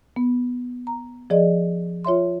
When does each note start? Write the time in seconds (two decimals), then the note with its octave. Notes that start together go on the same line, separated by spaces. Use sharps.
0.16 B3
0.87 A#5
1.30 F3 G#4 D5 D#5
2.05 F4 C#5 E5 C6